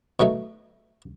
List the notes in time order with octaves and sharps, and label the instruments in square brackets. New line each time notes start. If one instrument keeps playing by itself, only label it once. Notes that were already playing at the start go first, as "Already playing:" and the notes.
[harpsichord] B2 F#3 A3 D#4